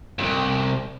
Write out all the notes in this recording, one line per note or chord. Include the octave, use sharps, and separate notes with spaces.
C2 F2